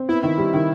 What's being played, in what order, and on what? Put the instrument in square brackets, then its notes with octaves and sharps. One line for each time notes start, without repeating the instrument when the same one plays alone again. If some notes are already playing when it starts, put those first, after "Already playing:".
Already playing: [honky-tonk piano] C4
[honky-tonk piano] B3 [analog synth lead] E4
[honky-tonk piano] D#3 [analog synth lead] E4
[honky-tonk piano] G3
D#3